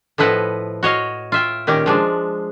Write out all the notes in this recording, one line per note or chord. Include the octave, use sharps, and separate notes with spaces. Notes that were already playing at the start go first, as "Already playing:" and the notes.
A2 F3 E4 B4 D#5 F#5
F#4 C#5 D#5 F5
F4 E5 G5
A#2 D#3 C#4 G4
F3 G#3 D4